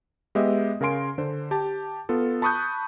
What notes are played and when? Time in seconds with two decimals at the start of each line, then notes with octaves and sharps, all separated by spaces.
0.35 G#3 B3 G4 D#5 E5
0.81 C#3 A#4 F5 G#5 C6 D7
1.18 D3 C5
1.51 G4 A5
2.09 B3 F4 A4
2.42 A5 B5 C#6 D#6 F#6 G6